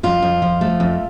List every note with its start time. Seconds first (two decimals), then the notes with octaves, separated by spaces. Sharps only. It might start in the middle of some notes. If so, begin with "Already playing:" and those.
0.03 F2 F4
0.22 F2
0.42 F3
0.61 A3
0.80 F2